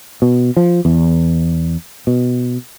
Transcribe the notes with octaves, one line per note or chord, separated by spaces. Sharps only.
B2
F3
E2
B2